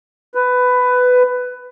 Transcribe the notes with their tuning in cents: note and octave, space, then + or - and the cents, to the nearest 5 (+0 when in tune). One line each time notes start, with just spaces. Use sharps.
B4 +15